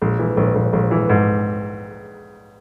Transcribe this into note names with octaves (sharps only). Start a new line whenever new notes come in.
A#1
E3
A#1
A#1
A#1
E3
G#2